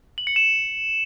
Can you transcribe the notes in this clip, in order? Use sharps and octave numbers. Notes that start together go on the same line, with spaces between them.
F#7
C#7
E7